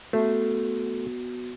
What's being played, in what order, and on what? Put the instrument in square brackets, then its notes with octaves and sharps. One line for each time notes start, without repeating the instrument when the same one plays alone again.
[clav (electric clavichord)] A3 [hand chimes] B3 F#4